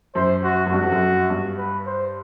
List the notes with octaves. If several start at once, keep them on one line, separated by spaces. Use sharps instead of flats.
F#2 C5
F#4
F#2
G2 F#4
F2
F#2
G2
B4
C5